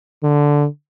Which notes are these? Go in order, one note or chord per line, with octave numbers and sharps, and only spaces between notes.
D3